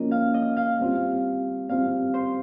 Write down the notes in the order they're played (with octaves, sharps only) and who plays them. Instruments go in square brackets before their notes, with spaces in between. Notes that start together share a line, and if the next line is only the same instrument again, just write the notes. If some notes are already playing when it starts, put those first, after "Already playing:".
Already playing: [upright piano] F3 A#3 C#4 [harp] D#5
[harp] F5
D#5
F5
[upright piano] G3 C4 F4
[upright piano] G3 C4 F4 [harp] F5
[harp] C5